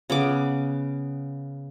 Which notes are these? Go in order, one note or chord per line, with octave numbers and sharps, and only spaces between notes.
C#3 B3 D6